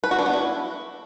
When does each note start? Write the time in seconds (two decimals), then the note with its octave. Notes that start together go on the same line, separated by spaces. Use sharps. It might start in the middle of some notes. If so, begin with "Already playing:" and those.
0.04 B4
0.11 F#4
0.19 D4
0.26 B3
0.34 E4